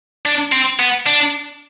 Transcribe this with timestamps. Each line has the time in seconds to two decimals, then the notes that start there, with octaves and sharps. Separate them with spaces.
0.26 D4
0.52 C4
0.79 B3
1.06 D4